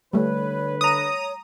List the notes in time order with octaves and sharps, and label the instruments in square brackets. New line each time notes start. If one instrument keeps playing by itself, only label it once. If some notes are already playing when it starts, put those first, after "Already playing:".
[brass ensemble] D3 B4 [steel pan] G3 A3 [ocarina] C#5
[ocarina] C#5 [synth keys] A#5 D#6